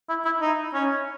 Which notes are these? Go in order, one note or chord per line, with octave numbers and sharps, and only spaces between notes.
E4
E4
D#4
C#4